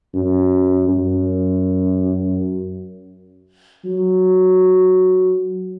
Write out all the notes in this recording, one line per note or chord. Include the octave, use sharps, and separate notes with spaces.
F#2
F#2
F#3